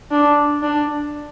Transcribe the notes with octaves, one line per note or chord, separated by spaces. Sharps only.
D4
D4